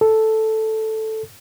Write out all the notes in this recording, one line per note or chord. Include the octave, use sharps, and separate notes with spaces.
A4